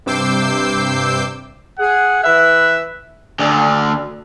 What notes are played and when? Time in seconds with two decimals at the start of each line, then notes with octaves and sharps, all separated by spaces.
0.06 G2 C3 D6 E6 G6 C7
1.79 G#4 F#5
2.23 E3 B4 E5 F#6
3.39 D2 D3